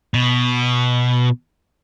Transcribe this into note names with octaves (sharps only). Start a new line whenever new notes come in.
B2